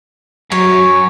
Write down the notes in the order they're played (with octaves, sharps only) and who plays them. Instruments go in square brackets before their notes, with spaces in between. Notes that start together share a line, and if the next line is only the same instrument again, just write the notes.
[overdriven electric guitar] F#2 [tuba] F#3 [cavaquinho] C#5